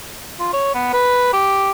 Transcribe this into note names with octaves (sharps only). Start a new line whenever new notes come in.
F4
C#5
B3
B4
G4